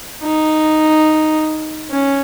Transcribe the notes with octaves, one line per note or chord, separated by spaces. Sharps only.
D#4
C#4